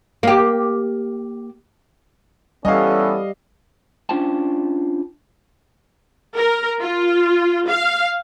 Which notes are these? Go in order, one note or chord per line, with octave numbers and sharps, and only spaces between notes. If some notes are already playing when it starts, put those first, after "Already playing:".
A#3 G4
E3 G3 B3 C#4 A4 D#5 F5
C#4 D4 F4 C5 G5 A5
A#4
F4
F5